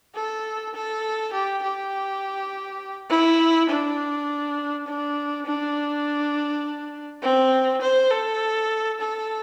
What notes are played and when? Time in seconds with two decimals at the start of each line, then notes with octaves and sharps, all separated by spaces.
0.15 A4
0.74 A4
1.33 G4
1.63 G4
3.09 E4
3.70 D4
4.87 D4
5.46 D4
7.22 C4
7.82 C5
8.11 A4
9.00 A4